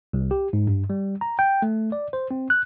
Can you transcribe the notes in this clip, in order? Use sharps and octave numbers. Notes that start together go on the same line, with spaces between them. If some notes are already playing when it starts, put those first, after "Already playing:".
C2
G4
G#2
G2
G3
A#5
G5
A3
D5
C5
C4
F#6